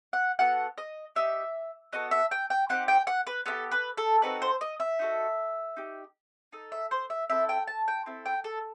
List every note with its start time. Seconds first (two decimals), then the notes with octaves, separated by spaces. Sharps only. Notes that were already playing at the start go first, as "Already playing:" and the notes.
0.13 F#5
0.39 B3 F#4 A4 F#5
0.78 D#5
1.16 D#4 G4 E5
1.92 B3 F#4 A4 D#5
2.11 E5
2.31 G5
2.50 G5
2.69 C4 D#4 G4 F#5
2.88 G5
3.07 F#5
3.27 B4
3.46 B3 E4 G4 A4
3.71 B4
3.97 A4
4.22 C4 D#4 F#4 A4 B4
4.42 C5
4.61 D#5
4.80 E5
4.99 D#4 F#4 A4
5.77 D#4 G4
6.52 D#4 A4
6.72 E5
6.91 C5
7.10 E5
7.30 C4 E4 A4 E5
7.49 G5
7.67 A5
7.88 G5
8.06 C4 E4 A4
8.25 G5
8.44 A4